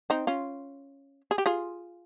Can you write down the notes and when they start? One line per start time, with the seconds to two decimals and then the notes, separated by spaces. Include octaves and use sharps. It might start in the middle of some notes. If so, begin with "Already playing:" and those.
0.10 C4 D#4
0.27 C#4 F4
1.31 G#4
1.38 G4
1.46 F4 G#4